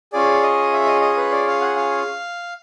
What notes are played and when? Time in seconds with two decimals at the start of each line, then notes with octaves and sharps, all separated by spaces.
0.13 C#4 F4 G#4 D5
0.43 D#5
0.73 E5
0.87 D#5
1.01 D#5
1.17 B4
1.32 D5
1.47 F5
1.61 F#5
1.76 F5